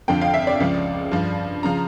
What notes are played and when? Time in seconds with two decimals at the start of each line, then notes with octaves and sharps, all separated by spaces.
0.08 F2 D3 F3 G5
0.21 F5
0.34 E5
0.47 D5
0.60 C#2 C#3 F3
1.12 G2 F3
1.63 C#3 F3 A#5